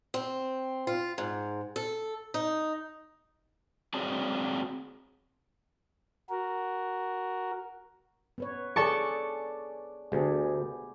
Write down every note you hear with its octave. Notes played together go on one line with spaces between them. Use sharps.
C4
F4
G#2
A4
D#4
C4 F#4 G#4 C#5 D5 A5
F#4 A#4
B3 B4 C#5
G#4 A4 D5 A5 C#6
D2 B3 G4 G#4